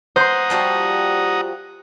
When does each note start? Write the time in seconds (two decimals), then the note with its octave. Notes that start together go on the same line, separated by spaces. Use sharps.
0.16 C5 F#5 A#5 C6 D#6
0.50 F3 G3 F#4